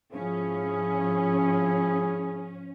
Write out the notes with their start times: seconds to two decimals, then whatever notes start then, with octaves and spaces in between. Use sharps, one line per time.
0.13 G#2 F3 C#4 E4 G#4